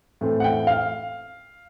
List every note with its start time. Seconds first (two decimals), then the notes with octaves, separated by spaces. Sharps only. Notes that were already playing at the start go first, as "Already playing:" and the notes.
0.21 A2 E3 A3 C4
0.40 F#5
0.44 G5
0.67 F5